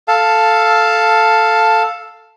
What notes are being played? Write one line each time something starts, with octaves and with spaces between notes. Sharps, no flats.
A4 F5 A5